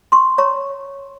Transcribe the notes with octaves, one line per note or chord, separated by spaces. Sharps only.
C6 C#6
C#5 A#5 C#6